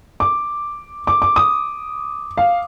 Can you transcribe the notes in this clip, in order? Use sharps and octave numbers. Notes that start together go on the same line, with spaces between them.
D6
D6
D6
D#6
F5